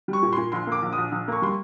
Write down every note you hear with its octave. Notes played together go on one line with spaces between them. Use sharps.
G3
C#6
A#2
A#2 C6
A#1 C6
A#3 D6
A#1
D#6
A#1
A#1
A#3 C#6
G3 C6